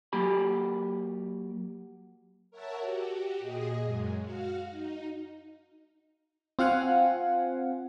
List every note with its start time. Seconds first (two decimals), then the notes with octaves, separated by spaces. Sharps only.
0.13 F#3 A#3 G4 B5
2.51 A#4 C#5 E5 F#5 A5
2.80 F#4 G4
3.39 A#2 G#4 D#5
3.85 F#2 G#3
4.21 F#4 F5
4.70 D#4
6.59 C4 F4 F5 F#5 G#5